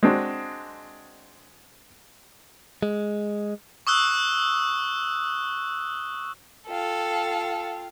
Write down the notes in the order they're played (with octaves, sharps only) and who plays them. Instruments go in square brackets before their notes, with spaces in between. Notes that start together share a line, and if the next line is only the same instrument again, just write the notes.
[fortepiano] G#3 C4 D4 F#4
[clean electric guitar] G#3
[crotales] C#6 D#6 E6 F#6
[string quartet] F4 F5 [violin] A4 [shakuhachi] G5